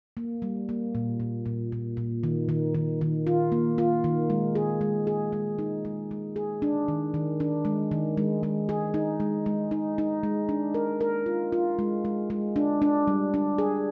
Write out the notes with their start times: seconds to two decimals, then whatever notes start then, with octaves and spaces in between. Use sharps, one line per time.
0.17 A#3
0.42 G3
0.69 A#3
0.95 A#2
1.20 A#2
1.46 A#2
1.72 A#2
1.97 A#2
2.23 D#3
2.49 D#3
2.74 D#3
3.01 D#3
3.27 F4
3.52 A#3
3.78 F4
4.04 D#3
4.30 G#3
4.55 G#4
4.81 G#3
5.07 G#4
5.32 G#3
5.59 D#4
5.85 G#3
6.11 G#3
6.36 G#4
6.62 D4
6.88 D#3
7.14 D#3
7.40 D4
7.65 G#3
7.91 D#3
8.17 G#3
8.43 G#3
8.69 G#4
8.94 D#4
9.20 G#3
9.46 G#3
9.71 D#4
9.98 D#4
10.23 G#3
10.49 D4
10.74 A#4
11.01 A#4
11.26 F4
11.52 F4
11.79 G#3
12.05 G#3
12.30 G#3
12.56 D4
12.82 D4
13.07 G3
13.34 D4
13.58 G#4